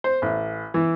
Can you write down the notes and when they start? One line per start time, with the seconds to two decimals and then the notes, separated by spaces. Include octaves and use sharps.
0.04 C5
0.22 A1
0.74 E3